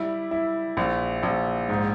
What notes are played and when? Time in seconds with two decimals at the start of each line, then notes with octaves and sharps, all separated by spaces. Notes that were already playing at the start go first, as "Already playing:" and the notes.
Already playing: G3 E4
0.31 E4
0.77 A#1
1.23 A#1
1.69 G#2